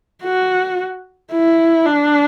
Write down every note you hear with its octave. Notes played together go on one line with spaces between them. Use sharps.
F#4
E4
D4